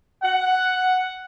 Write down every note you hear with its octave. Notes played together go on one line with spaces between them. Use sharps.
F#5